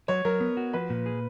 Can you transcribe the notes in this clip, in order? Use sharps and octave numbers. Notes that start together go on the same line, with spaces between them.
F#3 C#5
F#3 A#4
B3
F#4
F3 B4
A#2
G#4